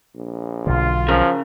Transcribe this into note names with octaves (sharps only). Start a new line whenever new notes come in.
A#1
B1 D3 F4
C#3 F3 A#4